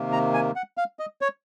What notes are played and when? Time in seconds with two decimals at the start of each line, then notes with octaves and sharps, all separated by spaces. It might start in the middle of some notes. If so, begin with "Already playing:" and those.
Already playing: C3 D#3 A#3
0.12 A#5
0.34 G#5
0.56 F#5
0.77 F5
0.99 D#5
1.21 C#5